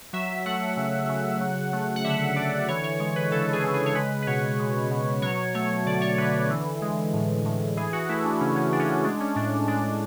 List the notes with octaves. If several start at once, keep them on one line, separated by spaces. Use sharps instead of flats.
F#3 E5
A3 F#5
C#3
C#3
F#3
A3
F#5
D3 E5
D3 D5
E3 C#5
C#5
G#3 C#5
B4
C#3 A4
G#4
C#3
G#4
C#5
G#3 B4
B4
B2 C#5
G#3
B2
F#3 C#5
A3 C#5
D3 D5
C#5
D3 B4
E3
G#3
A2
A2
E3 G#4
F#4
A3 E4
D4
C#3 C#4
C#4
C#3 D4
C#4
D4
G#3 D4
C#4
A2 D4
G#3 D4
D4